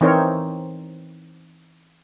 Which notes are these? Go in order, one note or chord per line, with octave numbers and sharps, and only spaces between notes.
E3 C4 D#4 A#4 C5 C#5